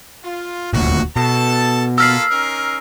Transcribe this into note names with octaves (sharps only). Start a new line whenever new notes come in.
F4
D#1 D2 A#2 F#4
B2 A4 A5
A#3 F4 A4 E6 F6 C7
C#4 D#4 A#4